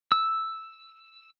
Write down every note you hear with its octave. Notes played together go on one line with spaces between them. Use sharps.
E6